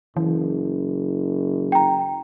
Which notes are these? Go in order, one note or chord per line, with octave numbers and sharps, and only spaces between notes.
F#1 E3
G5 A#5